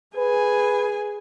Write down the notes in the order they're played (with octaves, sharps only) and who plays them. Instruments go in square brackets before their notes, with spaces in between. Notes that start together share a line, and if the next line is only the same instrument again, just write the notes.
[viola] G#4 G#5 [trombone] B4